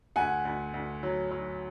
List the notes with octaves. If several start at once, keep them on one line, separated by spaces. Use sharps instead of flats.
D2 F#5 G#5
D2
D2
F#3
F#3